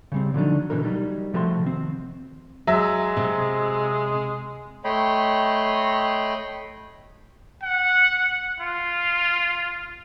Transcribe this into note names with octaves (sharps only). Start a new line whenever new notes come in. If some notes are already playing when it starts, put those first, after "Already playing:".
C#3 G3 C4
D3 F3 F#3 A3 D4 D#4
B2 D3 E3 A#4
F#3 G3 D#4
C3 F3 A3 F#4 A#5 C6
D#3 C4
F#3 G#3 E5
C3
A3 C#5 D#5 G5 B5 C6
F#5
F4